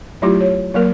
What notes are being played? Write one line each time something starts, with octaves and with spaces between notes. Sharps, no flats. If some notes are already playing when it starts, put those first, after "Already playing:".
F#3 A3 E4 F4 G4
C#5
F#3 A#3 A#4